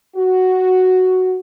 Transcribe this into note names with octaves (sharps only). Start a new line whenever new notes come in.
F#4